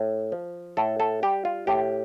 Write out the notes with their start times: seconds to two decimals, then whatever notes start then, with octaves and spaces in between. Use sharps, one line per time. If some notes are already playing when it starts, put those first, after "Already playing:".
Already playing: A2
0.32 F3
0.77 A2 A4
1.00 A4
1.23 G3 G4
1.45 F4
1.67 A2 G4